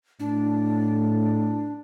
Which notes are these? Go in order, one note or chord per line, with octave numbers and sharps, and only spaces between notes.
A2 D4